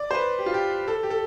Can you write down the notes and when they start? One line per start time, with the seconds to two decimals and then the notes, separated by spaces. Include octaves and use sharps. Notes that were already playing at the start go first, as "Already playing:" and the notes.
Already playing: D5
0.11 C5
0.14 B4
0.39 G4
0.46 F4
0.54 G4
0.88 A4
1.03 G4
1.10 A4